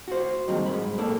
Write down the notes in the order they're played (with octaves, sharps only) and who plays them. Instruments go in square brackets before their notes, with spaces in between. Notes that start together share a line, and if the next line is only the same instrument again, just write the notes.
[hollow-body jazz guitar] F#4 C5
G2 A#2 D#3 F#3 G#3 C4
G#2 B5
A#2 A#3 A4 D5